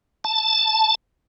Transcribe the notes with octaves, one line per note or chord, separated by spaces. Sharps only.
A5